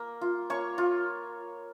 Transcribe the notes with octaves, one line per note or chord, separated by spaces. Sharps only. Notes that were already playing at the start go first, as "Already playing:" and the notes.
Already playing: A#3
F4
A#3 C#5 C#6
F4